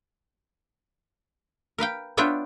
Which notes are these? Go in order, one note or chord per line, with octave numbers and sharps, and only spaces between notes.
A#4 B4 F5 G5
B3 D4 F4 C#5 E5 G5